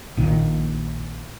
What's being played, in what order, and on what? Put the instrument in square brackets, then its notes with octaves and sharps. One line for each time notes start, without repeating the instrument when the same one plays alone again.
[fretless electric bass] A#1 A#2 D#3